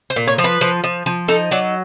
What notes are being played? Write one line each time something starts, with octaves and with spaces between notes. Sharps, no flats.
C5
A#2
C#5
F3
B4
F3
F3
F3
D#4 A4
F#3 D5